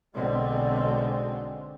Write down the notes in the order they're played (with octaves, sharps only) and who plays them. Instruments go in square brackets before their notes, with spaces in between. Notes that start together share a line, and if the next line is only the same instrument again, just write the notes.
[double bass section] B1 B2 D3 G#3 C4